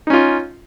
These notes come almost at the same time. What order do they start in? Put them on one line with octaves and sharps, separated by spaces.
D#4 C#4 F4